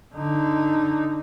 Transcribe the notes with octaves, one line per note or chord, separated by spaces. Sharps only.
D3 D#4